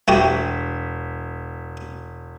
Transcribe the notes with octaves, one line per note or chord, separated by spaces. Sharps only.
E1 A3 F#4 G4